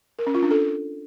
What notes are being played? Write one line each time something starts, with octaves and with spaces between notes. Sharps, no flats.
A#4
C#4
F4
D4
A4